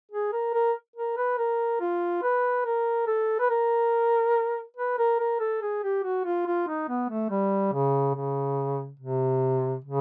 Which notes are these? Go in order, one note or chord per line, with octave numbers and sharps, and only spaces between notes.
G#4
A#4
A#4
A#4
B4
A#4
F4
B4
A#4
A4
B4
A#4
B4
A#4
A#4
A4
G#4
G4
F#4
F4
F4
D#4
B3
A3
G3
C#3
C#3
C3
C#3